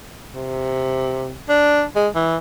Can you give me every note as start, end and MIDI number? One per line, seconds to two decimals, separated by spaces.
0.34 1.35 48
1.49 1.84 62
1.96 2.09 56
2.15 2.37 52